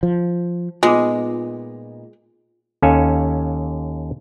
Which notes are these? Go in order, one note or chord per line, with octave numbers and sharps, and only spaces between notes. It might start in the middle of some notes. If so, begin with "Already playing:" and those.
F3
A#2 G#3 B3 D#4 F4 D6
D#2 C#4 A4 F5 G#5